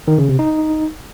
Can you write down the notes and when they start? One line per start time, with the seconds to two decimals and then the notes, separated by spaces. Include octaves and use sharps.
0.08 D#3
0.18 C#3
0.29 C3
0.39 D#4